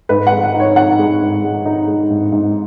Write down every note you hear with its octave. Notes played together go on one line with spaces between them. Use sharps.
G#2 B4
F#5
G#3
F#5
D#4
C#5
D#4 F#5
G#3
G#2
G#3
D#4
G#3
G#2
G#2